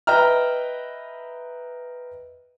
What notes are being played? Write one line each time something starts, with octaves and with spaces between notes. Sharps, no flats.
B4 D#5 E5 G5 A#5 F6